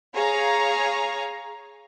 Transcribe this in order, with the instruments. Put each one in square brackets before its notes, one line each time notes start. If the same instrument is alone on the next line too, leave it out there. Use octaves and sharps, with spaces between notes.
[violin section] G#4 C#5 F5 A#5